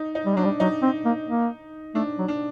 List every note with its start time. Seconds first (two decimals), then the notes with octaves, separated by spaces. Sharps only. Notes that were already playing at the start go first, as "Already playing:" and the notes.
Already playing: D#4
0.15 D#4
0.25 G3
0.35 F#3 D4
0.44 G3
0.60 F#3 D#4
0.82 C4
1.05 A#3
1.27 A#3
1.95 A3 D4
2.18 F#3
2.28 D4